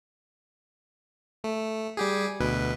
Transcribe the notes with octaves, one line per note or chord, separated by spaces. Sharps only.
A3
G3 G4 G#4
D2 B2 B4